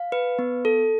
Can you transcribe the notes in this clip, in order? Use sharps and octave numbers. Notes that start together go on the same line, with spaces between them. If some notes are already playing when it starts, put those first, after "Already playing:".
Already playing: F5
B4
B3
A4